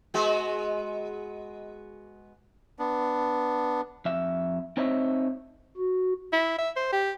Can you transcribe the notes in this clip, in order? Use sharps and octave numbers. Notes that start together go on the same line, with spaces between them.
G#3 B3 F#4
B3 D4
F2 E5
C4 D#4 C5 C#5 D#5 E5
F#4
E4
E5
C5
G4